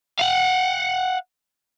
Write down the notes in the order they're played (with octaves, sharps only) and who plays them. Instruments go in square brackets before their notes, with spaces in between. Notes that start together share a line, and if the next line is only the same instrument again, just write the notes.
[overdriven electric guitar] F5 F#5